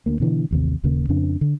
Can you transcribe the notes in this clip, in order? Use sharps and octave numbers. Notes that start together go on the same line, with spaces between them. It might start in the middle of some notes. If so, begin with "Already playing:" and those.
D2 A#3
B2 D3 E3
A1 D#2 C3
D#1 D#2 C#3 A#3
F2 C#3 C4 D4
D3